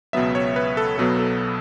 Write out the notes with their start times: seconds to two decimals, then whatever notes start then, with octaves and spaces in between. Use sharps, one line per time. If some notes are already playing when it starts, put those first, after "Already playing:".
0.13 C#2 B2 F#3 B3 E5
0.35 C#5
0.56 B4
0.77 A4
0.98 B1 B2 F#3 B3 A4
1.19 A4